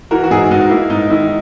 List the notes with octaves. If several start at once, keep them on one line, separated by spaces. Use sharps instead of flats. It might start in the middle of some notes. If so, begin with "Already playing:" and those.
E3 F#4 A#4
F#4
G#2 E4 G#4
G#2 D#4 F#4
A#3 E4
G#2 D#4
D#3 E4